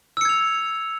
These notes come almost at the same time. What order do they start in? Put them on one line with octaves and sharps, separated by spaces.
E6 C#7 G#6 F7